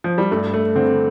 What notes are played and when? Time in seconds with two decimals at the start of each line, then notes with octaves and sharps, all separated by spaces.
0.04 F3
0.18 G3
0.31 G2 A3
0.54 A3
0.75 D3 C4